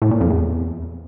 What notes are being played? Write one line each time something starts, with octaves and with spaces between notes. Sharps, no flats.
A2
A#2
F2
E2